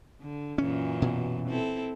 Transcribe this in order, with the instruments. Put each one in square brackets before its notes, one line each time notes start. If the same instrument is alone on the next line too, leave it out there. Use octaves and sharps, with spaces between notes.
[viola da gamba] D3
[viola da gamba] F#2 A#2 E3 [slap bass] C#4
[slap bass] B2
[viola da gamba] C4 E4 A4